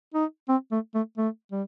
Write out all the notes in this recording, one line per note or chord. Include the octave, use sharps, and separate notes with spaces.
D#4
C4
A3
A3
A3
G3